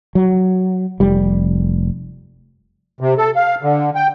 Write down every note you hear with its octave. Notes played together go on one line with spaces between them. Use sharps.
F#3
F1 G3
C3
A4
F5
D3
G5